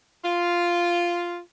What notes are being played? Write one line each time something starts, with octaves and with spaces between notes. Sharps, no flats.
F4